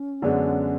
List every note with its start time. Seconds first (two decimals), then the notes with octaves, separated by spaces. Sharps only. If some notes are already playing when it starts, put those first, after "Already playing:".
Already playing: C#4
0.22 F#2 D3 G#3 B3 D4